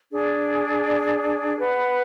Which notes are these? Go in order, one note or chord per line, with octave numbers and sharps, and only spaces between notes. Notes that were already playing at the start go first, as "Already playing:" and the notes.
D4 G#4 D5
B4 F#5 B5